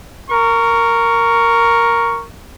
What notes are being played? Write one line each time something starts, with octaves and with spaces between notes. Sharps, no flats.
A#4 C#6